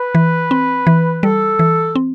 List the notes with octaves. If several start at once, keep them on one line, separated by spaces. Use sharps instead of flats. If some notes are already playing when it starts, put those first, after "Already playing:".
Already playing: B4
E3
C4
E3
G3 A4
E3
C4